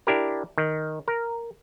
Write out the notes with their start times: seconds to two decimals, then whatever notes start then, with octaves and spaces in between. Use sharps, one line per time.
0.07 D4 E4 G4 A#4
0.58 D#3
1.08 A#4